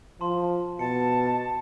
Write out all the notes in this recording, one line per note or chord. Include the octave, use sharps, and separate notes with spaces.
F3 A5 C6
B2 A5 C#7